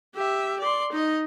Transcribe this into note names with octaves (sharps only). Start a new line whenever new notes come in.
G4 E5
D5 C6
D#4 D#5